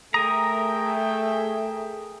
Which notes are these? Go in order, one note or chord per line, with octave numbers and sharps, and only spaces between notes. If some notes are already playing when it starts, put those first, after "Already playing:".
A3 G#4 A#4 E5 G5 G#5 A#5 D#6